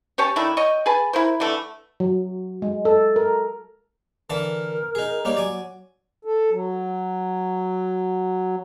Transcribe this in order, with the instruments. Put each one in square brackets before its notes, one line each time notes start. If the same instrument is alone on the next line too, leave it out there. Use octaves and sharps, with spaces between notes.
[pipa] C#4 G4 C#5 A5
D#3 A3 D4 E4
C#5 D#5 G5
G#4 B4 G#5 A5
E4 A#4 C5
D3 E3 A3
[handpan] F#3
G#3
A4
A#4
[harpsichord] D3 E3 A5 [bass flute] A#4
[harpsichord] D#4 G#4
[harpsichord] G3 A#3 D#4 [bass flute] C#5
[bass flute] F#3 [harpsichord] D5 G#5
[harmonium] A4
F#3